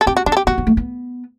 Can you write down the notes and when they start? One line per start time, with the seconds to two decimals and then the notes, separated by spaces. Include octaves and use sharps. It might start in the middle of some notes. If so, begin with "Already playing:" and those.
0.01 A4
0.07 C4 G4
0.17 F#4
0.26 C4 D4
0.32 A4
0.37 G4
0.47 B3 F#4
0.58 B3
0.67 A3
0.77 B3